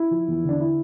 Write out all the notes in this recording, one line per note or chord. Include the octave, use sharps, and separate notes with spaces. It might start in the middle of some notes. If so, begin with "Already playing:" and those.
Already playing: E4
F3
E2
D3 D4
E4